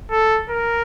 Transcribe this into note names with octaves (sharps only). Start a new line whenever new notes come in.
A4
A#4